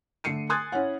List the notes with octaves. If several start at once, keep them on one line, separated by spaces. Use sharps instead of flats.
D3 A3 C7 C#7 D#7
G#5 C6 D#6 F#6 G#6 A6
C#4 E4 C#5 F#5